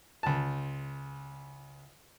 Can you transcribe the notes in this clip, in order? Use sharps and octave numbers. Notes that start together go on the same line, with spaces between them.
C#2 A5